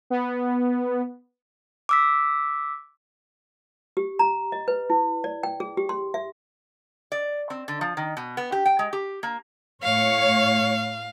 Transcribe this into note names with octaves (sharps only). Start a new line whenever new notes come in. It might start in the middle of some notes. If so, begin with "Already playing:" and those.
B3
D6 E6 B6
G4
A#5
D#5
B4
E4
D5
G5
G#4
G4
C6
E5
D5
C4
D3
F3
D#3
B2
B3
G4
G5
G#3
G4
A#3
A2 C#5 F5